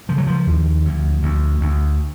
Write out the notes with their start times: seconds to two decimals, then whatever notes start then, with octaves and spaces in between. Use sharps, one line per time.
0.09 C#3 F3
0.18 F#3
0.27 F3
0.47 D#2
0.85 D2
1.23 D2
1.61 D2